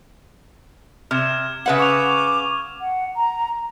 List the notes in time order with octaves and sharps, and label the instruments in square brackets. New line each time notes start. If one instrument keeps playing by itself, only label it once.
[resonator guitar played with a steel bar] C3 [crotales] F6 G#6 E7
[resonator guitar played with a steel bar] C#3 B4 F#5 [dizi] E5
[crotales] C#6 F7 [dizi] D6
[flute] F#5
A#5